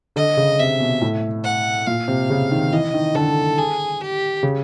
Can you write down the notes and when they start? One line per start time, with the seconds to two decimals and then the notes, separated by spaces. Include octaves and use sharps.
0.16 D3 D#5
0.37 C#3
0.59 C3 E5
0.80 B2
1.02 A2
1.44 F#5
1.87 A#2 F5
2.08 C3
2.30 C#3
2.51 D#3
2.72 E3 D#5
2.94 D#3
3.15 D3 A4
3.58 G#4
4.01 G4
4.43 C#3